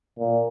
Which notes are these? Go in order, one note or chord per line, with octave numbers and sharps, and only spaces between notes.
A#2